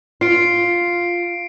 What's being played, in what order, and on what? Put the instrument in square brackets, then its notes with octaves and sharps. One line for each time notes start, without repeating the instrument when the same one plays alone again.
[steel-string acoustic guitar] F4 [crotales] C7 D7